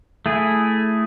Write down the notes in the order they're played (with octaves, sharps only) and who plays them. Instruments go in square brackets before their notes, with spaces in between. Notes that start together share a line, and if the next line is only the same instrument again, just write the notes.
[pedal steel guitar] A3 E4 G#4